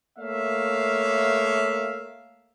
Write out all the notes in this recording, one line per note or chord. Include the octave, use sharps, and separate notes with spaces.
A3 A#3 C#5 E5 F5